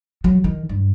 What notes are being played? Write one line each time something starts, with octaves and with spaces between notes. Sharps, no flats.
F#3
D#3
G2